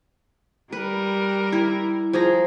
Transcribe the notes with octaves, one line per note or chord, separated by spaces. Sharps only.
G3 A#4 B4
E4
F3 G#4 A#5